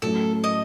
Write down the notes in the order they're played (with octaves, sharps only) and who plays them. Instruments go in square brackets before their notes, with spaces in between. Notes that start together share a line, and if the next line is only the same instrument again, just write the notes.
[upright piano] A2 F#3 A3 C#4 E4 [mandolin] A4
[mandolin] D#5